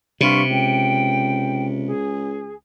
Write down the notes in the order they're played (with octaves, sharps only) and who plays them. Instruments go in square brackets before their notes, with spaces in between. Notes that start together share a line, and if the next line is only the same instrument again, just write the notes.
[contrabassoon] G2 [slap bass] C3 [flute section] F4 B5 C#6
[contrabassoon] C#2 [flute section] G5
[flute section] G#4